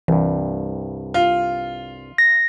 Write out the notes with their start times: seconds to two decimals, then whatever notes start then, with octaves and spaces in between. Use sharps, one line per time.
0.08 C2 G2 E3
1.14 F4
2.18 A#6